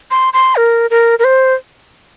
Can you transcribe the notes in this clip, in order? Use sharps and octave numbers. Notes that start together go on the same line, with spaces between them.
C6
C6
A#4
A#4
A#4
C5